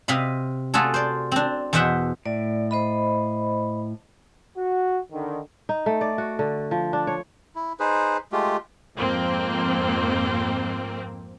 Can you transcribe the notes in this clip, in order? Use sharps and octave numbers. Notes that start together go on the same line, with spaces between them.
C3 D#5 F5 B5
A3 F4 F#4 G#4 A4
C5 D5
C4 D4
E2 B2 C5 E5 F#5 G5
A2 D5
C5 D#5 B5
F#4
D3 D#3
D#4
A3
D5
F#4
D3
F3
D4
C#5
E4
D#4 G#4 B4 C5
G#3 A3 F4 G4
F2 G#2 A#3 C4